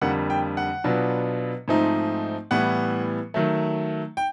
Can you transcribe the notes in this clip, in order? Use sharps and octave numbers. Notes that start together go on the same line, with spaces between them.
F2 D3 G3 A#3 F#5
G5
F#5
B2 F#3 B3 D4 F4
G#2 F3 A3 C4 D#4
A2 E3 G3 B3 F#5
D#3 F#3 A3
G5